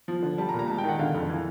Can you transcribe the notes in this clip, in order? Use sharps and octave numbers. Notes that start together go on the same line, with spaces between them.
F3
D3
G3 A5
A#5
A#2
A#5
G#3 A5
G5
D#3 F#5
D3 F5
F2
E3